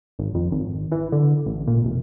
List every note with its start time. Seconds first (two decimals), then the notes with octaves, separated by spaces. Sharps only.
0.19 G#1
0.35 F2
0.52 G#1
0.92 E3
1.12 D3
1.46 A1
1.67 A#2
1.84 F1